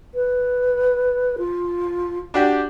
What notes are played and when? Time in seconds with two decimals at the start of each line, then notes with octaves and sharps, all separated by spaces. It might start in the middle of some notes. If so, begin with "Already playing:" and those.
0.14 B4
1.38 F4
2.34 D4 F#4 G4